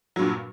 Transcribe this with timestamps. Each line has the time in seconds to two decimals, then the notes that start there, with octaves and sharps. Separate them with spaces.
0.16 F#3
0.19 G2
0.22 A#2